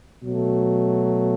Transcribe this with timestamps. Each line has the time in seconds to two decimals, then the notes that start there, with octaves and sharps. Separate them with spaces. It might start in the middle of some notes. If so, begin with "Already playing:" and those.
0.23 B2 F#3 A3